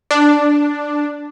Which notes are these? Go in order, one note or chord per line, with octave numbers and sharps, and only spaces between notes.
D4